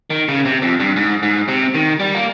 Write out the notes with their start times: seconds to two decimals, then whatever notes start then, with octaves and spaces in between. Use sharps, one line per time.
0.10 D#3
0.28 C#3
0.45 C3
0.62 F2
0.80 G2
0.96 G#2
1.23 G#2
1.48 C3
1.74 D#3
2.00 G3
2.14 A#3